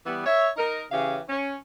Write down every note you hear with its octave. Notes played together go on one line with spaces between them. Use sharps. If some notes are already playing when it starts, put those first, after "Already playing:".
E3 G3 B3
C#5 E5
D#4 A#4
C#3 E3 C#4 G4 F5
C#4